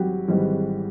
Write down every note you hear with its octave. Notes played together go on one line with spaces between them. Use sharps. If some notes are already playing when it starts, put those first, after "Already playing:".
Already playing: G#1 G#2 E3 F#3 G3 E4 F#4 G4
G#1 G#2 E3 G3